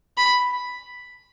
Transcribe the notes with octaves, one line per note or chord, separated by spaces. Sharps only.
B5